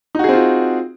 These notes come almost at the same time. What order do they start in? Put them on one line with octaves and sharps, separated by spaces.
D#4 F#4 G#4 C4 F4